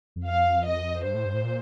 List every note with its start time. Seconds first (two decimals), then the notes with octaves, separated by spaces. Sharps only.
0.16 F2
0.26 F5
0.66 D#5
1.05 G2 C5
1.14 A2
1.25 G2
1.34 A2
1.44 A#2